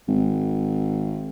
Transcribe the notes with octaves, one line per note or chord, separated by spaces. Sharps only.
G#1